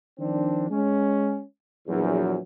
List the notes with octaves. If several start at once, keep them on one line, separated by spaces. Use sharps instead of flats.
D#3 F3 C4 D4
G#3 C#4
A#1 E2 F#3